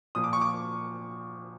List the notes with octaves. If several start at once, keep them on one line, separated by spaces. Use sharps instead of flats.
A#2 F3 D#6
D6
C#6
D6